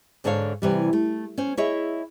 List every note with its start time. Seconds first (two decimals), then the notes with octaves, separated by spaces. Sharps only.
0.24 G#2 D3 A4 C5 C#5 F5
0.62 C3 E3 G3
0.93 A3
1.38 C#4 C5
1.57 E4 G#4 C#5 D#5 E5